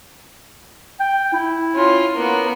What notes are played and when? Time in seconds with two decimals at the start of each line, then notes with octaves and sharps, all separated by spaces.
1.00 G5
1.33 E4
1.75 C#4 F4
2.15 A#3 B3